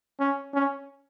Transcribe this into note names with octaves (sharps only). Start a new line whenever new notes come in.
C#4
C#4